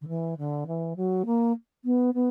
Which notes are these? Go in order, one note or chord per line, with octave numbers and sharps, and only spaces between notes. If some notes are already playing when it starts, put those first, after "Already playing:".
D3
E3
D3
E3
F#3
A#3
B3
B3